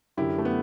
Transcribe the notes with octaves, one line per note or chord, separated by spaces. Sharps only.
F#2 D3 E4 G4
A3
B3